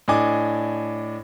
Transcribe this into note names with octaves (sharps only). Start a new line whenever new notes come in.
A2 D4 D#5 G#5 D6